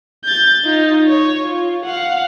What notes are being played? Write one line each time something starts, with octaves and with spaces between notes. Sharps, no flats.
G6 A6
D#4 F4
C#5
F4
F5 F#5